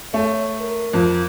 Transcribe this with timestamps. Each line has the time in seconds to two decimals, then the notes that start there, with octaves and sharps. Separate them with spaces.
0.14 A3 C#5
0.60 A#4
0.93 F2